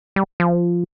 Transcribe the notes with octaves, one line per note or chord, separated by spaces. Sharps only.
G3
F3